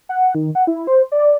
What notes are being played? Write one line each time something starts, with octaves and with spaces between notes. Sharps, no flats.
F#5
D#3
F#5
E4
C5
D5